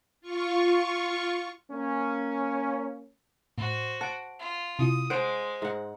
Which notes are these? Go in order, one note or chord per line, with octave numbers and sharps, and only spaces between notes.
F4 C#6
A#3 C#4
A2 F#4 C5
F#5 A5 D7
F4
C3 E4 F4 D#6
G#3 C5 F#5 D7
G#2 F#5